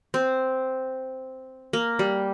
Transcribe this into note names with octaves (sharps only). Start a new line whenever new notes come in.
C4
A#3
G3